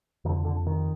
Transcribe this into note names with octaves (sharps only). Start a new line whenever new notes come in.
F2 D3 D#3
D3
D#3